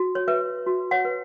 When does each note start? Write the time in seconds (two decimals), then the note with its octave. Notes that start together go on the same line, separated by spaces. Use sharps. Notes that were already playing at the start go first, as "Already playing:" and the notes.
Already playing: F#4
0.15 C#5
0.28 B4 E5
0.66 F#4
0.91 C#5 F#5
1.05 B4